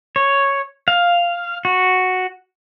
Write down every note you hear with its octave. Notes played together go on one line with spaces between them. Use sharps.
C#5
F5
F#4